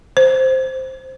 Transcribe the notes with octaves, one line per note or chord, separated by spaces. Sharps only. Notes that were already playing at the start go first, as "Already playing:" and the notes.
C5